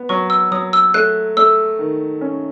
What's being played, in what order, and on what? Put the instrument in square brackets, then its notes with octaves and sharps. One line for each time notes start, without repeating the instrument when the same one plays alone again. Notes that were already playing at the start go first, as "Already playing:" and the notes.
Already playing: [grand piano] B3
[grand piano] F#3 [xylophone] C#6
[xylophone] E6
[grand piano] F#3 [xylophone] D#6
[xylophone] E6
[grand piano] A3 [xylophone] F#6
[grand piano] A3 [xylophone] E6
[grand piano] D#3
C#4